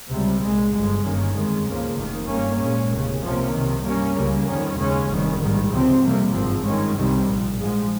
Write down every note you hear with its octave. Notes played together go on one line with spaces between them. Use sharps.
C#2 C3 G3
C2 A#2 G#3
G1 G2 F3 G#3
G1 G2 D#3 A#3 C#4
F2 D#3 G#3
C#2 C#3 F3 A#3
F1 D#2 D#3
G2 G3 A#3 C#4
A#1 A#2 G#3 C#4
F1 D#2 C#3
C2 C3 F3 A#3 C#4
C2 C3 D#3
G2 G3 A#3 C#4
C#2 C#3 G3 A#3
F2 D#3 G3 C#4
D#2 C#3 G#3 C#4
F1 F2 D#3 G3
A#1 G#2 D#3 G3
C#2 C3 F3 C4
F2 C3 G3 A#3
G#1 G2 F3 C4
G2 D#3 G#3 C#4
C2 C3 D#3 G3 C4
A#1 A#2 F3
G#2 F3 G#3